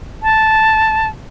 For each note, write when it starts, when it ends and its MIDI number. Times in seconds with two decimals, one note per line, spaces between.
0.23 1.07 81